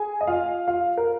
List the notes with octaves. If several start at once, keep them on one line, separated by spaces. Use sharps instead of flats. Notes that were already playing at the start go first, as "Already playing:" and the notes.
Already playing: G#4 G#5
D#5
F4 F5
F4 F5
A#4